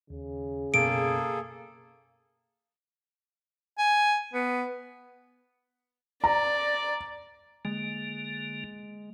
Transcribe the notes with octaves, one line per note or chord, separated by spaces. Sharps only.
D#2 C#3
F#2 B2 A#3 G#4 A4 D7
G#5
B3
D5 A#5
D3 G#3 A#3